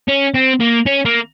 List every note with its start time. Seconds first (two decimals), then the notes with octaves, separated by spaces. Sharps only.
0.08 C#4
0.34 C4
0.60 A#3
0.86 C#4
1.05 A#3